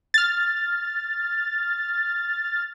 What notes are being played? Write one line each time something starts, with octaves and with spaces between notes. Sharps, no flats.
F6 A6